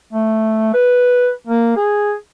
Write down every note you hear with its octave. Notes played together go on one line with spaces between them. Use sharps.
A3
B4
A#3
G#4